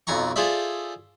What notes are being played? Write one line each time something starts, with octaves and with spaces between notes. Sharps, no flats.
B1 F2 G#5 A#5 C#6
F4 G#4 A4 C5 D5 E5